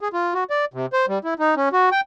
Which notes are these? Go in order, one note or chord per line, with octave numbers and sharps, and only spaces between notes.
G#4
F4
F#4
D5
C3
C5
G3
E4
D#4
C#4
F#4
G5